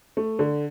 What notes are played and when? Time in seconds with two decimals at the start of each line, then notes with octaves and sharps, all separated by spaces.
0.17 A3
0.39 D3